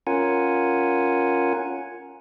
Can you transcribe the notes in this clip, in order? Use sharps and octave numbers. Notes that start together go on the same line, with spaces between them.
C#4 F4 A#4 F#5 G#5